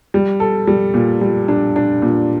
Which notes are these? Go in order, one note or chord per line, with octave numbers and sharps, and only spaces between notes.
G3
A4
G3
A#2
G3
D4
D4
A#2